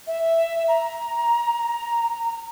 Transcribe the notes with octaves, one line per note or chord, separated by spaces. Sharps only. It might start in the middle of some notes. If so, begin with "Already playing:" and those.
E5
A#5